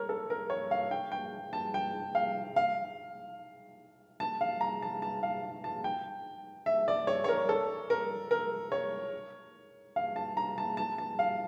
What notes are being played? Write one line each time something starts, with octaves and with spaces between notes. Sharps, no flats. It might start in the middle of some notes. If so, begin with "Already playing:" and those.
Already playing: A#4 C#5
A4
A#4
C#5
F5
G5
G5
A5
G5
F5
F5
A5
F5
A#5
A5
A5
F5
A5
G5
E5
D5
C#5
C#5
A#4
A4
A#4
A#4
C#5
F5
A5
A#5
A5
A5
A5
F5